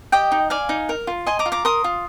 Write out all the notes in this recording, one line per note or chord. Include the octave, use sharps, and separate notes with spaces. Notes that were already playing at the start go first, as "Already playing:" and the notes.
G4 D#5 G5
D#4
D5 F5 G#5
D#4
A#4
F4
D#5 G#5 C6
A#5 D6
F4
A#5 D6
A#4 C6 D#6
F4